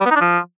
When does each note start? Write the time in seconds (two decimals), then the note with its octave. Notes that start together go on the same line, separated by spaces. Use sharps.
0.01 G3
0.06 B3
0.11 D#4
0.16 D4
0.21 F3